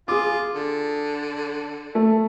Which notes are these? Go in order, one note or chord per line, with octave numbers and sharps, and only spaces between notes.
F4 G#4 D6
D3
A3